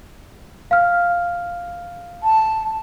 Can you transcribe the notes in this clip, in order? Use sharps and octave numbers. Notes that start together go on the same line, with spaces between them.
F5 F6
A5